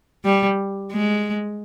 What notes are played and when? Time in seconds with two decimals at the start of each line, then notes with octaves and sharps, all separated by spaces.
0.25 G3
0.92 G#3